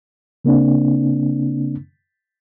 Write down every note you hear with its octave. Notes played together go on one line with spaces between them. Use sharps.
C#3 A#3 C4 D4